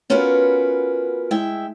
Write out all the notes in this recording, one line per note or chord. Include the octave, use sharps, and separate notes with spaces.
B3 C#4 F4 F#4 A#4 B4
G#3 E4 E5 G5